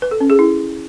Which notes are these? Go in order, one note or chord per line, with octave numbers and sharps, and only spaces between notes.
B4
A4
C#4
G#4
E4